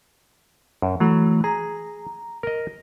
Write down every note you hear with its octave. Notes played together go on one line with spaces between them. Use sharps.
F#2
E3 F#3 A3
G#4 A#5
A#4 D#5